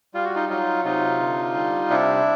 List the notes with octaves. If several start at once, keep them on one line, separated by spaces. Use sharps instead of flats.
G3 F4
F#4
D#4 F4
F#3 D#4 F4
C3 D#4 F4
D3
G3
C3 D4 E4